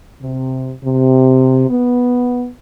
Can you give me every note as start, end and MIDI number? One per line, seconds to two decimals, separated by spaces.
0.20 0.72 48
0.82 1.66 48
1.68 2.46 59